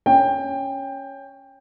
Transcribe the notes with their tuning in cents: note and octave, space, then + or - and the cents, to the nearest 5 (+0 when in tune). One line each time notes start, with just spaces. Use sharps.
C#4 +0 G5 +15